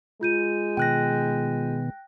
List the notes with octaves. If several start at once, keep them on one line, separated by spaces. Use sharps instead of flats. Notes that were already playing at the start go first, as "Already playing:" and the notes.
G#3 F4 G6 D#7
B2 D#3 B3 G5 F#6 A#6